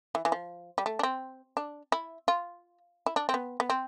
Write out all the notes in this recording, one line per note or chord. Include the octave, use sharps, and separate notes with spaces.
E3
E3
F3
G3
A3
D4
C4
D4
E4
F4
E4
D4
C4
B3
B3
C4